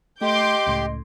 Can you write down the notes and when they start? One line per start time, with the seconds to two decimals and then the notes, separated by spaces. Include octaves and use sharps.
0.21 A3 G4 D#5 C6 D6 G6
0.67 C#2 A2